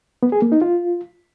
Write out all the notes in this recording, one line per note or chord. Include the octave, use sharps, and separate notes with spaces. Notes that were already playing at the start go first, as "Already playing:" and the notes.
B3
G#4
A#3
D#4
F4